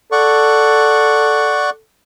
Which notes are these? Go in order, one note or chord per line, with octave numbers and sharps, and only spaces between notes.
A4 D5 F#5 C#6